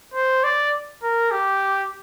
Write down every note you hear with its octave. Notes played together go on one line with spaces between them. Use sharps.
C5
D5
A#4
G4